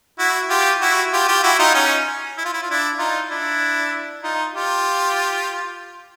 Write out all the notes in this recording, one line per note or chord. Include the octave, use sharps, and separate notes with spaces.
E4 F#4
F4 G4
E4 F#4
F4 G4
F4 G4
E4 F#4
D#4 F4
C#4 D#4
E4
F4
E4
F4
D4 E4
D#4 F4
D4 E4
D#4 F4
F4 G4